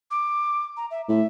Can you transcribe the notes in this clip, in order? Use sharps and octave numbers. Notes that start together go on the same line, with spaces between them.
D6
A#5
E5
A2 E5